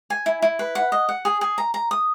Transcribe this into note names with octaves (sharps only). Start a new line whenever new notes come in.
G#5
E4
E4
B4
F#5
D#5
F#5
G#4
G#4
A#5
A#5
D#6